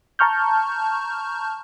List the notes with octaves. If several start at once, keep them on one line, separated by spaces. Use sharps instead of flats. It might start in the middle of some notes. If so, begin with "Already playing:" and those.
A5 A#5 C#6 F6 G6